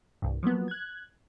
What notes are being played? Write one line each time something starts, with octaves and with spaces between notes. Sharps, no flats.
C2 G2
F3 F#3 A#3 B3
F#6 G#6